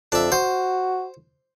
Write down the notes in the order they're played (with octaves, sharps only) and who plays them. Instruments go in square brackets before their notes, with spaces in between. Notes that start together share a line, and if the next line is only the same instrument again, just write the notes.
[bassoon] F2 [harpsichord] D4 E5
[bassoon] F#4 [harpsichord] C5